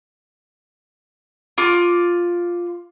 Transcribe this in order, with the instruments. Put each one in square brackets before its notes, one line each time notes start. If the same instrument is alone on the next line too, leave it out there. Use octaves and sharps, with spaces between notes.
[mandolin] F4 D6